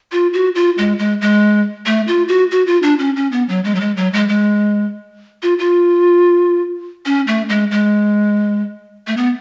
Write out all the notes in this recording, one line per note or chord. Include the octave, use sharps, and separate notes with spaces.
F4
F#4
F4
G#3
G#3
G#3
A3
F4
F#4
F#4
F4
D4
C#4
C#4
B3
F#3
G#3
F#3
G#3
F#3
G#3
G#3
F4
F4
C#4
A3
G#3
G#3
A3
B3